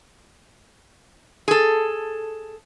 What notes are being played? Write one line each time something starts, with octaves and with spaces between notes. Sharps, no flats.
G#4 A4